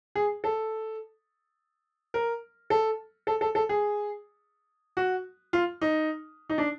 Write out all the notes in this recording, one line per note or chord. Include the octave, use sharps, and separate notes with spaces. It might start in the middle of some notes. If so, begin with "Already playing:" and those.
G#4
A4
A#4
A4
A4
A4
A4
G#4
F#4
F4
D#4
D#4
D4